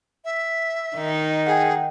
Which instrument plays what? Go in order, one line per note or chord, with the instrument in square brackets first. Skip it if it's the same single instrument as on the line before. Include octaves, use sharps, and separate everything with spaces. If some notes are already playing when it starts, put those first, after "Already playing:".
[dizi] E5
[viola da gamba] D#3 D#4
[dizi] G#4 [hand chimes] F#5 G5